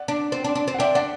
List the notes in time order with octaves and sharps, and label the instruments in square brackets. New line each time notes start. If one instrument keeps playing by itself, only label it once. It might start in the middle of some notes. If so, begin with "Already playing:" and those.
Already playing: [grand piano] D5 F#5
[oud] D4
C4
D4
D4
C4
[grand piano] F#5
[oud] D4 [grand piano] E5 G5
[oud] D4 [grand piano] D5 F#5